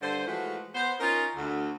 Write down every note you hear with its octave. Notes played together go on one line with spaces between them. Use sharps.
G2 D3 C5
E3 F3 G#3 A3 F#4
B3 C5
C#4 D#4 F4 A#4
D2